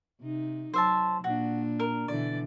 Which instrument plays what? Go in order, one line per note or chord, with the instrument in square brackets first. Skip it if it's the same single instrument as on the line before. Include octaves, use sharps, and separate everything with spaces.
[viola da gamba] C3 D#4
[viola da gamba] F#3 [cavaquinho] C5 E5 A5
[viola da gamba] A#2 D4 [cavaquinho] F#4
[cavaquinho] A#4
[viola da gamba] B2 D3 E3 [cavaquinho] D5